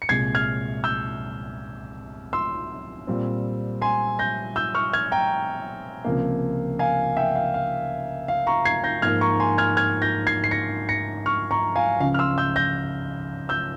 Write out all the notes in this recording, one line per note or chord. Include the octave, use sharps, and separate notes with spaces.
C#7
C2 A#2 G#3 G#6 C7
F6 G#6
E6 G6
C6 E6
A#2 G3 C4
G#5 C6
G6 A#6
E6 G6
C#6 F6
F6 G#6
G5 A#5
C#2 C3 F3 A#3
F5 G#5
E5 G5
F5
F5
F5
A#5 C#6
G#6 C7
G6 A#6
G#2 F3 A#3 F6 G#6
A#5 C#6
G#5 C6
F6 G#6
F6 G#6
G6 A#6
G#6 C7
C7
A#6 C#7
A#6 C#7
C#6 F6
A#5 C#6
F5 G#5
C#2 C#3 F3 F5
F6
C6 E6
E6 G6
G6 A#6
E6 G6